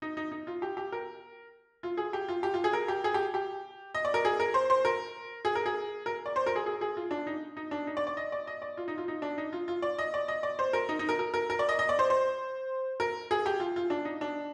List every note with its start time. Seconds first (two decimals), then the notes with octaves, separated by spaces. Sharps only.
0.02 D#4
0.17 D#4
0.32 D#4
0.47 F4
0.62 G4
0.77 G4
0.92 A#4
1.83 F4
1.97 G#4
2.13 G4
2.28 F4
2.43 G4
2.54 F4
2.64 G#4
2.73 A#4
2.88 G4
3.04 G#4
3.14 G4
3.34 G4
3.95 D#5
4.05 D5
4.14 A#4
4.25 G#4
4.40 A#4
4.54 C5
4.70 C5
4.85 A#4
5.45 G#4
5.55 A#4
5.66 G#4
6.06 A#4
6.26 D5
6.36 C5
6.46 A#4
6.56 G#4
6.66 G#4
6.81 G#4
6.97 F4
7.11 D4
7.27 D#4
7.57 D#4
7.71 D4
7.87 D#4
7.97 D5
8.07 D5
8.17 D#5
8.32 D5
8.47 D#5
8.62 D5
8.77 F4
8.88 D#4
8.98 F4
9.08 D#4
9.22 D4
9.38 D#4
9.53 F4
9.68 F4
9.82 D5
9.98 D#5
10.14 D5
10.28 D#5
10.43 D5
10.59 C5
10.73 A#4
10.89 D#4
10.99 D#4
11.09 A#4
11.19 A#4
11.34 A#4
11.50 A#4
11.59 D5
11.69 D#5
11.79 D#5
11.89 D5
11.99 C5
12.10 C5
13.00 A#4
13.31 G#4
13.46 G4
13.60 F4
13.76 F4
13.90 D4
14.05 D#4
14.21 D4